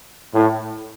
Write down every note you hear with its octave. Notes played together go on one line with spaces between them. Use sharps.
A2